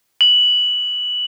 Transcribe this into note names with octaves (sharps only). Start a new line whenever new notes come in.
F#7